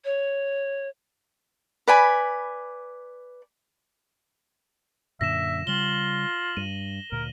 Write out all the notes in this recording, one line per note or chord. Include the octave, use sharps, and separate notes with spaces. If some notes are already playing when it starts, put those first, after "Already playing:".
C#5
B4 D5 G#5 B5
F#2 A#2 D3 E5 A#6 E7
C#3 G3 F4 F#7 G7
G2 D#7
D2 A#2 A#4